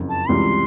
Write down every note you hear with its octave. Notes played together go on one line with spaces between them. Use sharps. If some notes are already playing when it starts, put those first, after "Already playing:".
Already playing: F#1 F2 C#3
A5
C#2 C3 E3 G3 C6